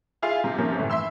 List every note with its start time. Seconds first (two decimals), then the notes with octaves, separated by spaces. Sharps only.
0.22 E4 F4 G#4 F5 C6
0.44 C3
0.58 C3 F3 A#3 C#4
0.77 G1 A2 E3
0.90 E4 E5 B5 C6 E6